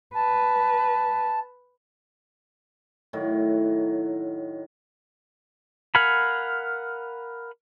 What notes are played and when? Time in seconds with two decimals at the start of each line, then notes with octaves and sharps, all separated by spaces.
0.15 B4 A5
3.13 A2 D#3 F#3
5.95 A#4 F5 F#5 G#5 B5